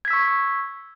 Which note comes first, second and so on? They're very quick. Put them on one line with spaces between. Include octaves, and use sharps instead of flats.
G#6 B6 E6 C#6